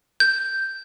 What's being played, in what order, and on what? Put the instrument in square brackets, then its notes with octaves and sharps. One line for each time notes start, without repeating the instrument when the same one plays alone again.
[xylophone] G6